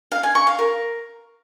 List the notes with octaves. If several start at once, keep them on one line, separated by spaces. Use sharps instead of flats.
F5
G#5
C#6
F5
A#4